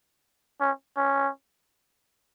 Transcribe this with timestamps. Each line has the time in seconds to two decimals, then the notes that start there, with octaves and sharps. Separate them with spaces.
0.60 C#4
0.97 C#4